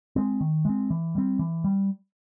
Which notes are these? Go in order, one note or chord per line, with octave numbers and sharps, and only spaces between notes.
G#3 C4
D#3
G#3 C4
E3
G3 C4
E3
G3